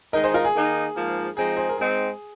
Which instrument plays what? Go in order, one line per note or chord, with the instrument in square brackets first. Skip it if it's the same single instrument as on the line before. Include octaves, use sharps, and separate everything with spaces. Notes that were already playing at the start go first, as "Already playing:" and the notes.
[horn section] D#3 G#3 D#4 [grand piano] A#4 D#5
[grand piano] G#4 C5
F4 A#4
G#4
[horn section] D#3 A#3 D#4
G#2 F3 A#3
[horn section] F3 G#3 C4 D#4 [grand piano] G#4
[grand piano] G#4 C5
A#4
[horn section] G#2 G#3 C4 D#4 [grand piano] G#4